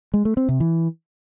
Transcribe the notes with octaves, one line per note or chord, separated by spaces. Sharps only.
G#3
A3
C4
C3
E3